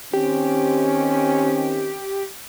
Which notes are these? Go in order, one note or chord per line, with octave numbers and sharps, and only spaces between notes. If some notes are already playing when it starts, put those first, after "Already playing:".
D#3 C4 C#4 G4